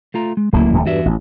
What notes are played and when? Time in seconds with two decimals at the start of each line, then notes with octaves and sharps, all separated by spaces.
0.14 A3 F4 A#5
0.37 G#3
0.53 D1 C#2 F#3 A3 A#3 E4
0.73 E1 D#2 A3
0.86 E2 G2 F#4 E5
1.06 A1